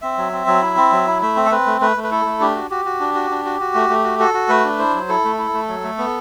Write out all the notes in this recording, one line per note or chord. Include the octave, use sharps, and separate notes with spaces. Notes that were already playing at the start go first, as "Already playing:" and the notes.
C4 E5
F#3
C4
F#3
E4
C4
F#3
E4
A3 E5
C4
A4
C4 B4
A3
A3 B4
A3
B4
E4 A4
A3
D4 G4
F#4
F#4 G4
F#4
D4
F#4
D4
F#4
F#4
A3
A3
F#4
F#4 A4
F#4
A3 B4
D4
E4 C5
F#3
E4 A4
A3
E4
A3
F#3
A3
B3